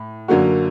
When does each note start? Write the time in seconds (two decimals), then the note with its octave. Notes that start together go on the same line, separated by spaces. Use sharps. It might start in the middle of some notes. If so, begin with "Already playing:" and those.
Already playing: A2
0.28 F#2 D3 F#3 A#3 F#4